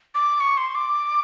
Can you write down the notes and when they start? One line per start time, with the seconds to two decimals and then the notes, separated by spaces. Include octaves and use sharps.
0.15 D6
0.40 C#6
0.57 C6
0.75 D6